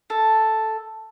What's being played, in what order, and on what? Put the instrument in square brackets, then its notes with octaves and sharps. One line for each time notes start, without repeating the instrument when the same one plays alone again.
[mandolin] A4